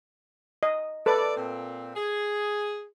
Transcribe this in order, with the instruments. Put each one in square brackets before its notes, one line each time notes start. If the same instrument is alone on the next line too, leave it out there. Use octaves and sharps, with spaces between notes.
[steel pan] D#5
[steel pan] A4 B4 [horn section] D5
[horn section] A#2 C4
G#4